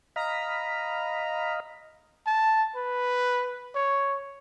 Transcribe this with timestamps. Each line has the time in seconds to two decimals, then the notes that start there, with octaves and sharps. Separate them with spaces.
0.16 D#5 F5 A#5 B5
2.27 A5
2.76 B4
3.75 C#5